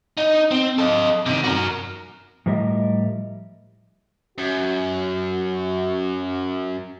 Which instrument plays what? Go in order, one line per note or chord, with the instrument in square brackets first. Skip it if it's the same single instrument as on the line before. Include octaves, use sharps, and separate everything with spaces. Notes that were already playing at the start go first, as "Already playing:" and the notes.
[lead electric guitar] D#4
C4
A4 D#5
C3 D#3
F#4 A#4
[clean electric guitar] A2 F3 G3 A#4 D#5 E5
[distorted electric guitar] F#2 [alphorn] F#4